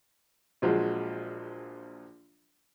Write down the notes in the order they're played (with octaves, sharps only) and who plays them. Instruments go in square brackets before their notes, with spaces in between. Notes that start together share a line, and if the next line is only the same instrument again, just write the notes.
[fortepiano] A#1 F3 F#3 G#3